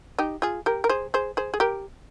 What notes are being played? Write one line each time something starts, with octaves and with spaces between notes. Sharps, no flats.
D#4 G4
F4 G#4
G4 A#4
A#4
G#4 C5
G#4 C5
G#4 C5
G#4
G4 A#4